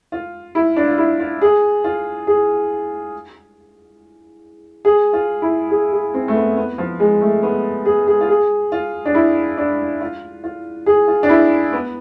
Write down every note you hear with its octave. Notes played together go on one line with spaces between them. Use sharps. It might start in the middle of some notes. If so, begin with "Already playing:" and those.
F4
E4
D4
F4
E4
F4
G#4
F4
G#4
G#4
F4
E4
G#4
G#4
C4
A3
B3
B3
F3
G#3
A3
B3
G#4
G#4
F4
G#4
F4
D4
E4
D4
F4
F4
G#4
F4
D4
E4
B3